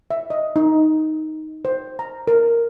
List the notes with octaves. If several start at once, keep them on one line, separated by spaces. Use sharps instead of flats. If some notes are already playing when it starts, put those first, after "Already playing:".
E5
D#5
D#4
C5
A#5
A#4